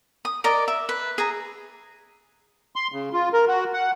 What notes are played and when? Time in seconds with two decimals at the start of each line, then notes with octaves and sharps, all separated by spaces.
0.25 D#6
0.44 A#4 D5 D#5 A#5
0.68 E5
0.89 B4
1.18 G#4 A#5
2.76 C6
2.92 C#3
3.13 F4
3.33 A#4
3.48 F#4
3.74 F#5